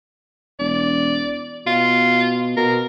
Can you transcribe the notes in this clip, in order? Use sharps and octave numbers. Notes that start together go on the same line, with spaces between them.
E1 D5
B2 F4
B2 A#4